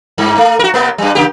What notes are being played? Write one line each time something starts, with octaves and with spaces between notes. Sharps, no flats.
G2
A3
F#4 A#4
C3 A#3 B3
G2 G3
C#3 A#3 G4